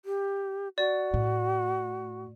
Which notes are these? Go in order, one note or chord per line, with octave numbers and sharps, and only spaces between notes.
G4
F#4 D5
A2